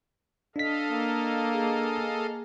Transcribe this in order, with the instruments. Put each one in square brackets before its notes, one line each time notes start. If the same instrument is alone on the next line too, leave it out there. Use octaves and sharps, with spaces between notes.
[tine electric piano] D4 B6 [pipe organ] A4 D#5 F5
[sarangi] A#3
[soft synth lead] G#4